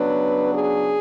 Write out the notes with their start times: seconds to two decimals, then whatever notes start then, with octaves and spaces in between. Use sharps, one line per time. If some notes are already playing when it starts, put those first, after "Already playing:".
Already playing: C#3 F#3 B3 D4 B4
0.53 G#4